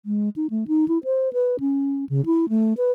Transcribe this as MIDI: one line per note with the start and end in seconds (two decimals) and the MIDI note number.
0.06 0.29 56
0.36 0.47 63
0.50 0.64 57
0.68 0.88 63
0.88 0.98 64
1.04 1.32 72
1.33 1.60 71
1.60 2.05 61
2.09 2.24 49
2.26 2.49 64
2.49 2.73 57
2.77 2.92 71